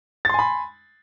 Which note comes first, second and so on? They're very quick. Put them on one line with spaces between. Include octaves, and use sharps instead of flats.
A6 C6 G#5 B5